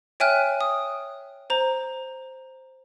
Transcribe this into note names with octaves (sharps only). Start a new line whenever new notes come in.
C#5 E5 G5 G#5 F6 F#6
D#6
C5 A#5